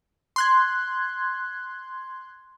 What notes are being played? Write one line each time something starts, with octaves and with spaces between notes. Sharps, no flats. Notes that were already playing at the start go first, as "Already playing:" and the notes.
C6 F#6 G#6